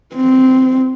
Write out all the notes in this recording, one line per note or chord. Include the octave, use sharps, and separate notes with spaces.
C4